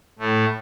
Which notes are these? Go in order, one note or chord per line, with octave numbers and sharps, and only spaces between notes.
A2 A3